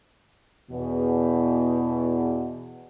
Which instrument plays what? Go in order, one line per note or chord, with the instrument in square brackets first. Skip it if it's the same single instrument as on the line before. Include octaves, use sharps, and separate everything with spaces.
[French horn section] E2 B2